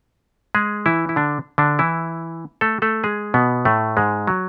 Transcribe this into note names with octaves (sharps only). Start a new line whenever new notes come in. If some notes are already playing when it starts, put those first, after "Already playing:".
G#3 G#4
E3 E4
E4
D3 D4
D3 D4
E3 E4
A3 A4
A3 A4
G#3 G#4
B2 B3
A2 A3
G#2 G#3
F#3